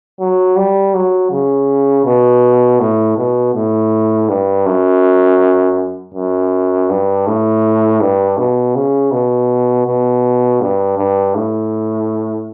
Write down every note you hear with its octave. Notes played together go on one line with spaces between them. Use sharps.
F#3
G3
F#3
C#3
B2
A2
B2
A2
G2
F#2
F#2
G2
A2
G2
B2
C#3
B2
B2
G2
G2
A2